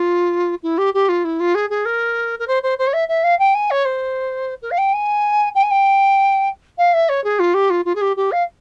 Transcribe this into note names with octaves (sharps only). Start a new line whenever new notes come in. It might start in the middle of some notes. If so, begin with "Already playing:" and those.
Already playing: F4
E4
G4
G4
F4
E4
F4
G#4
G#4
A#4
A#4
C5
C5
C5
C#5
E5
E5
F5
G5
G#5
C#5
C5
A#4
F5
G5
G#5
G5
G#5
G5
F5
E5
C#5
G#4
F4
G4
F4
F4
G#4
G4
G4
F5